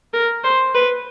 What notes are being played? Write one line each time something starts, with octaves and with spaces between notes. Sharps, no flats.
A#4
C5
B4